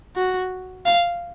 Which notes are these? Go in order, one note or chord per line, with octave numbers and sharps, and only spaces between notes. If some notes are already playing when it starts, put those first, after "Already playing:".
F#4
F5